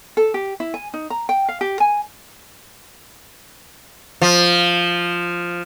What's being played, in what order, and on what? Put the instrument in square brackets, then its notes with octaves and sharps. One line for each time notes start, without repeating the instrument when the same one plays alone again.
[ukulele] A4
G4
E4
G#5
D#4
A#5
G5
F5
G4
G#5
[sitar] F3